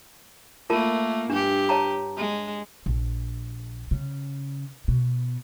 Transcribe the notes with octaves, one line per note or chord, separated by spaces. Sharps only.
A3 A#3 F4 A#4 A5
G2 D4 G4
C#5 A5 A#5
G#3
A#1
C#3
B2